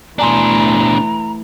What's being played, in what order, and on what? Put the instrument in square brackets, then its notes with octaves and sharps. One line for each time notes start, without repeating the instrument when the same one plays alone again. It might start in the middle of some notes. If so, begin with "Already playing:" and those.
[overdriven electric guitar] B2 D4 [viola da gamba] E3 A3 [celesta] D5 G#5 C6 [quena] A#5